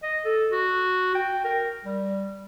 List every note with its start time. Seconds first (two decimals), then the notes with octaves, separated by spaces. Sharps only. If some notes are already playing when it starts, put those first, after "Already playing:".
0.03 D#5
0.25 A4
0.52 F#4
1.15 G5
1.44 A#4
1.85 G3